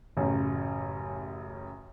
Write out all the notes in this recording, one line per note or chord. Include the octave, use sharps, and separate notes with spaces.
A1 F#2 C#3